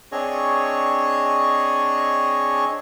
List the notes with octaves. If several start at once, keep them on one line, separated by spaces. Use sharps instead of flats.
C4 D4 G#4 C#5 D#5 C#6